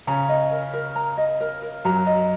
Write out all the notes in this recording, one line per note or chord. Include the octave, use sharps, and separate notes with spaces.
C#3 C#4 A#5
D#5
A#4
A#4
A#5
D#5
A#4
A#4
F#2 F#3 A#5
D#5